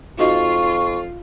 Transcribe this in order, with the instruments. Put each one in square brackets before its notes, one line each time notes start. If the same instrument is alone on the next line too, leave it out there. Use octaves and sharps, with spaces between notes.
[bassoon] F2 [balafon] D#4 F#4 D#5 [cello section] F4 [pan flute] C#6